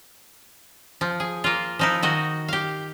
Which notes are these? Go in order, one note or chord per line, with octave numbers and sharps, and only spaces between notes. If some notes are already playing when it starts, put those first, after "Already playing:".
F3
G#4
A#3 F4
F3 D#4 E4
D#3 F#4 D#5
G4 F5